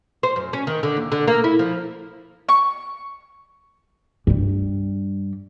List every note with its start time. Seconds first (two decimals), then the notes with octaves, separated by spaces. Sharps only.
0.23 C5
0.36 F#2
0.53 C#4
0.67 D#3
0.83 D3
0.97 D#2
1.12 D3
1.28 A#3
1.44 E4
1.59 F3
2.49 C#6
4.27 G2 G3